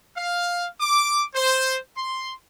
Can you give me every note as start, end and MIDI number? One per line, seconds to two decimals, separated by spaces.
0.17 0.67 77
0.80 1.22 86
1.34 1.78 72
1.96 2.33 84